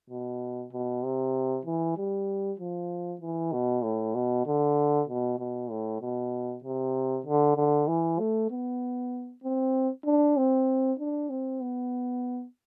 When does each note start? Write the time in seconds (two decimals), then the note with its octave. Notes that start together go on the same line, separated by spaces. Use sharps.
0.10 B2
0.73 B2
1.03 C3
1.66 E3
1.97 G3
2.60 F3
3.21 E3
3.52 B2
3.84 A2
4.15 B2
4.47 D3
5.08 B2
5.39 B2
5.70 A2
6.01 B2
6.64 C3
7.26 D3
7.57 D3
7.88 E3
8.19 A3
8.51 B3
9.44 C4
10.06 D4
10.37 C4
11.00 D4
11.30 C4
11.61 B3